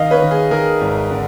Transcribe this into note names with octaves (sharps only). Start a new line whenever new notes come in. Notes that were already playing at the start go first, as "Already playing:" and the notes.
Already playing: D#3 D#5 F5
B4 C#5
D#3
G#4
D#3 G#4 A#4
G#1
D3